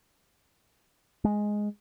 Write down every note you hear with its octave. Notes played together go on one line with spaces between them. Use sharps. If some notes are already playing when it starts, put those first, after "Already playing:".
G#3